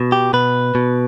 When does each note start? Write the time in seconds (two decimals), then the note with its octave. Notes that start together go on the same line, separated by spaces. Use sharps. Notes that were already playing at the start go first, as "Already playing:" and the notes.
Already playing: B2
0.12 G4
0.33 B2 B4
0.75 B2